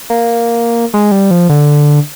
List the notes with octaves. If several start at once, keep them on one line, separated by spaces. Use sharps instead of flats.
A#3
G#3
G3
F3
D3